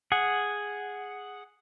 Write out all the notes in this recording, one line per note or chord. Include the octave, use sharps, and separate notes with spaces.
G#4 F#5